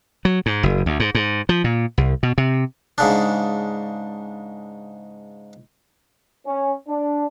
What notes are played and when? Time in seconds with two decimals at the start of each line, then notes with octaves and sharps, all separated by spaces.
0.25 F#3
0.46 G#2
0.63 F#1
0.86 D2
1.00 G#2
1.15 G#2
1.49 F3
1.64 A#2
1.98 C2
2.23 B2
2.38 C3
2.98 G#2 C#3 D4
6.45 C#4
6.87 D4